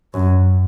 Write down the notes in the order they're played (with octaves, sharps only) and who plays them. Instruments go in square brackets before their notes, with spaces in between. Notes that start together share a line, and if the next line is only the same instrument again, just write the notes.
[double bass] F#2